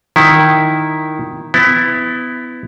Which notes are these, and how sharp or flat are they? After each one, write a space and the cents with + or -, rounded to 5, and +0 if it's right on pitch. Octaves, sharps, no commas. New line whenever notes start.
D#3 +0 E4 +0
B3 +25 E4 +0